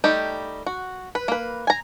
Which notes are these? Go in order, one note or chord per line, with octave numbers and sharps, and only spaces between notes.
G3 A3 D#4 G4
F#4
B4
A#3 B4
G#5 A#5